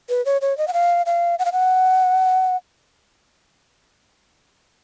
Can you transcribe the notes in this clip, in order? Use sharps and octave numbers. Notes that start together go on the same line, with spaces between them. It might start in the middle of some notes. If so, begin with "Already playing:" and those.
B4
C#5
C#5
D#5
F#5
F5
F5
F#5
F5
F#5